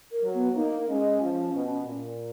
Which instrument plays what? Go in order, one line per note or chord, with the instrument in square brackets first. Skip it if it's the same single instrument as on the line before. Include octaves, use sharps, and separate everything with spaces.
[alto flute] A#4
[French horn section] F#3
[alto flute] B3
[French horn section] A#3 [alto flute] D#4
[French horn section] G#3 [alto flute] C#4
[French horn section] F3
B2
A#2